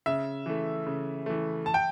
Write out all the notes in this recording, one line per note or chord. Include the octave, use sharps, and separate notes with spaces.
C#3 E5
E3 A3
C#3
E3 A3
A5
G5